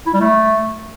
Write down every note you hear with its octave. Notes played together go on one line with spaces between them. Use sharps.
E4
G3
A3